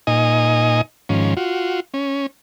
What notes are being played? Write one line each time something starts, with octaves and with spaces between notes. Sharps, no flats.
A#2 D#4 D#5 G#5
G#2 D#3 F3 C#4
F4 F#4
C#4